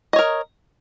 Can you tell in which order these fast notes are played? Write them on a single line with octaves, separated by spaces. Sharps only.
D#5 C#5 A#4